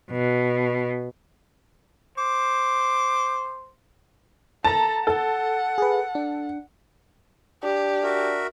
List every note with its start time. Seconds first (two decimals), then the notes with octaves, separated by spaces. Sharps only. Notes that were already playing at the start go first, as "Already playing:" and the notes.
0.10 B2
2.18 C5 D6
4.65 A4 A5 A#5
5.07 A4 F#5
5.78 G#4 B4
6.15 D4
7.63 D4 G4
8.03 F#4 A#4 E5